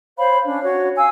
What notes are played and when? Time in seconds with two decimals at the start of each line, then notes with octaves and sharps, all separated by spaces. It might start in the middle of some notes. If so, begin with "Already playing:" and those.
0.18 C5 C#5 F5 B5
0.45 C#4 D4
0.63 F#4 C#5
0.98 F5 G#5 E6